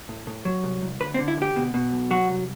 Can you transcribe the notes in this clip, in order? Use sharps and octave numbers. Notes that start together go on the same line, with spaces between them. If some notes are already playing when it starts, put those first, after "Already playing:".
A2
A2
F#3
C2
C2
D2 B4
C4
D3
E4
D2 G4
B2
B2
B1
F#3 F#4
C2